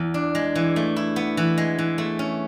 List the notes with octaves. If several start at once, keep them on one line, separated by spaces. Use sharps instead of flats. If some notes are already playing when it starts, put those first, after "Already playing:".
Already playing: E2
D4
G#3
E3
A3
E4
B3
E3
G#3
E3
A3
C#4